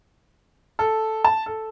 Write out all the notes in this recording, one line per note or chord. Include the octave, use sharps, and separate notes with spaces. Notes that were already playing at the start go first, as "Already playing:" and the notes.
A4
A5
A4